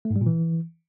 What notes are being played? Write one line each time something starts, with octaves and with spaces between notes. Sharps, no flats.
A3
G#2
G3
A#2
E3